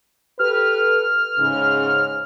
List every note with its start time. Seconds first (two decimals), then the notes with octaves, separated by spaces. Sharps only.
0.39 G4 A4 B4 F6
1.38 G#2 C#3